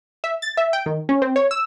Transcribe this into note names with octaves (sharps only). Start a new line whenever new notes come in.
E5
A6
E5
G5
D#3
C#4
C4
C#5
E6